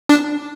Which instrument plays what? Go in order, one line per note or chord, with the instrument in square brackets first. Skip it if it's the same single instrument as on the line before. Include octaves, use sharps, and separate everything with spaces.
[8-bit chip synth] D4